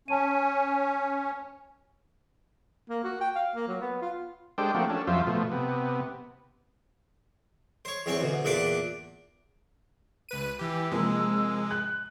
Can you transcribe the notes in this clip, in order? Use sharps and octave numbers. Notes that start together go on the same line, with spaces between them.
C#4 G#5 A5 D#7
A#3
F#4
G5
F5
A#3
F#3
B3
F4
G#3 D4 G4 A4 C5 G5
F3 A3 A#3 C4 F#4 G4
C#4 D4 A4
F2 F3 F#3 F4 C5 E5
B2 F3 A3
C3 B3
C5 C#5
E2 C4 C#4 C#5
D2 B2
E2 A#2 D4 B4 D6
C#2 B4 D#7
E3 G4 E6
C3 F3 G#3 A#3
F#6